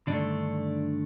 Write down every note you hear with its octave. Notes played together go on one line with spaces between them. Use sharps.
G2 D3 D#3 A3 D4